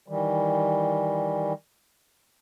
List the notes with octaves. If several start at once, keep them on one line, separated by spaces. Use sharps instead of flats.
D#3 E3 G3